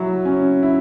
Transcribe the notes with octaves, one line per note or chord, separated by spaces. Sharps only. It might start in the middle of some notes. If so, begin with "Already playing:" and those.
Already playing: F#3 E4
C#4
E4